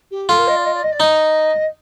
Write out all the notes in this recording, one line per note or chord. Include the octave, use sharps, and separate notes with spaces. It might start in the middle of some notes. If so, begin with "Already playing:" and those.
G4
F4 A4
A#4
D#5
D5
D#5
D5
D#5
D5
D#4 D#5